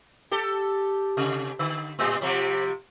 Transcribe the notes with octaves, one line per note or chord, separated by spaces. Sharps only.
G4 A4
C3
D3
A2 G3
C3 F3 G3